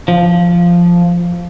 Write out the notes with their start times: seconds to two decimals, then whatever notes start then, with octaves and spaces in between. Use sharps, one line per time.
0.08 F3